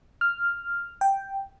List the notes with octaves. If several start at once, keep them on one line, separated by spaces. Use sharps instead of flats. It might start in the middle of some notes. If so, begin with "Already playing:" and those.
F6
G5